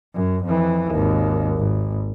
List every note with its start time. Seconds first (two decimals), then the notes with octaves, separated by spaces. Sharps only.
0.15 F#2
0.44 F2 E3
0.90 G#1 D#2
1.58 G#1